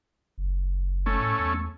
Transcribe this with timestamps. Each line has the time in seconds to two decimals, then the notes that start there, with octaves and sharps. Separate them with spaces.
0.38 F#1
1.06 A3 C#4
1.20 A2
1.39 E2